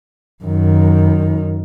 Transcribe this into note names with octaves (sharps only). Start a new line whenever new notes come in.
F#2 D#3